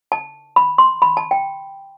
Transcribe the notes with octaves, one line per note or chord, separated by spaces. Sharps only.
A5
B5
C6
B5
A5
G5